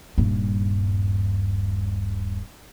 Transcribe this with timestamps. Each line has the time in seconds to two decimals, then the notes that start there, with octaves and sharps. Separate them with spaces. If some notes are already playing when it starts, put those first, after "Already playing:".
0.18 D#1 G2